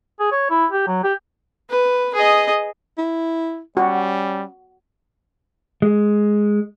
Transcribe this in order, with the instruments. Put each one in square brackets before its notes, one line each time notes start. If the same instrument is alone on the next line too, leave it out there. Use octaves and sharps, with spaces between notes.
[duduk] G#4
C#5
E4
G4
F#3
G4
[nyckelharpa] B4
G#4 D#5
[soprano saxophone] E4
[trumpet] G3 [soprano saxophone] C#4 [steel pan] F#4
[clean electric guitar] G#3